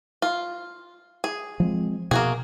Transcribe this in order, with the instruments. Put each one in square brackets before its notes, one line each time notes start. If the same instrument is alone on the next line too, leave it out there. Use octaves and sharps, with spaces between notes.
[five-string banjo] F4
G#4
[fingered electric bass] F3 G#3 C4
[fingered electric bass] B2 [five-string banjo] A#3 F#4 G#4